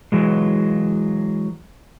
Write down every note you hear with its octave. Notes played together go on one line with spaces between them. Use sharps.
E3 F#3 G#3